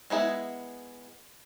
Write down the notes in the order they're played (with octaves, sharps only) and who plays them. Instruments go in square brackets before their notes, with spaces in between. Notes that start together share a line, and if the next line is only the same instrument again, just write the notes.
[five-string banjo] G#3 B3 E4 G#4